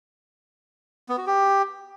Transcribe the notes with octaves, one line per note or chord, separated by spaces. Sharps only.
B3
F#4
G4